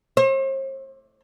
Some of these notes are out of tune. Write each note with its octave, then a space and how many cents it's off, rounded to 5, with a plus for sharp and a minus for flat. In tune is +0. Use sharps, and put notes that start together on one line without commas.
C5 +45